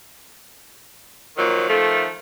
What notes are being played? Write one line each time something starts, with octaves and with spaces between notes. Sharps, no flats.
A#2 D#3 F3 F#3
D#3 F3 A3